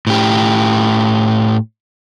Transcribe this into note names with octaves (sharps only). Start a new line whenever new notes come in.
A2 G4